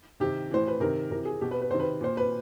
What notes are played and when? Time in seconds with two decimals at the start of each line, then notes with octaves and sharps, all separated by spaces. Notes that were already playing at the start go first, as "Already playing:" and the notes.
0.20 C3 D#3 G4
0.51 A2 E3 C5
0.68 B4
0.80 C3 D#3 A#4
1.11 C3 E3 A#4
1.25 G#4
1.41 B2 G4
1.51 B4
1.62 B4
1.71 C3 D#3 C5
1.79 B4
2.01 A#2 C5
2.17 B4